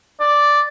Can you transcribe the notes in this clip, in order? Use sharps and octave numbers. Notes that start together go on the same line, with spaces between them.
D5